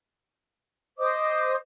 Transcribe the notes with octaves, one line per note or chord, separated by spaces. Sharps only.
C5 D#5 D6 D#6